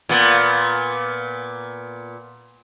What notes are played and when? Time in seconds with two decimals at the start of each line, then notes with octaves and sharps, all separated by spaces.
0.09 A#2 B3